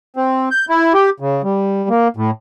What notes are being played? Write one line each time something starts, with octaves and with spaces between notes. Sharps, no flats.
C4
G6
E4
G4
C#3
G3
A#3
A2